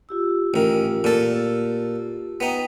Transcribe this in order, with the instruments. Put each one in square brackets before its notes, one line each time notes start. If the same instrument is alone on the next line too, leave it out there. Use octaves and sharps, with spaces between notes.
[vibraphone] F4 G4 E6
[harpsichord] A1 D#3
A#2 A4
[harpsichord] B3 D#4 [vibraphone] G5